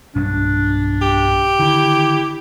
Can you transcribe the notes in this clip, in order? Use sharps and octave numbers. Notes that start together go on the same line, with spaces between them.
B1 G2 F#3 D4
G4
D3 D#3 E4